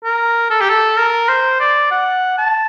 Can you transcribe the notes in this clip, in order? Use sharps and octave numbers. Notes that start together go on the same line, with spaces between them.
A#4
A4
G4
A4
A#4
C5
D5
F#5
A5